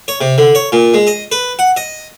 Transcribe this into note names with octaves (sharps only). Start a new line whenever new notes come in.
C#5
C3
D3
C#5
A#2
G#3
D#5
B4
F#5
D#5